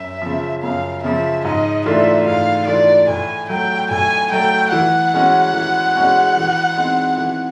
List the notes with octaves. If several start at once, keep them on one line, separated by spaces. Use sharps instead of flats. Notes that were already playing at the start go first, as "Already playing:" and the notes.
Already playing: F#2 E5
C#3 F3
F#2 F5
C#3 F3 E5
G#2 D#5
E3 A3 D4 F4 E5
G#2 F5
E3 A3 D4 F4 D5
A2 G#5
F#3 A3 G5
A2 G#5
F#3 A3 G5
E3 F#5
G#3 C#4 F#4
E3
G#3 C#4 F#4
E3
G#3 C4 D#4
E3